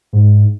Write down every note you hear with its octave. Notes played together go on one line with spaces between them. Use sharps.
G#2